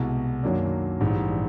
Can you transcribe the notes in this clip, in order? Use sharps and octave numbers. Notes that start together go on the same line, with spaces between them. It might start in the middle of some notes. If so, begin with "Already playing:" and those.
Already playing: C2 B2 G#3
F#2 D#3 F#3 A#3 D4
A#1 G#2 E3 G3